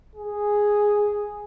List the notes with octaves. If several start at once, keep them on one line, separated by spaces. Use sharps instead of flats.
G#4